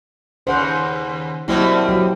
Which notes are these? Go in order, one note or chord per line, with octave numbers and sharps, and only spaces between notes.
D#2 C#3 C5 F#5
B2 F#3 G3 A#3 C4 E4
F#3 G4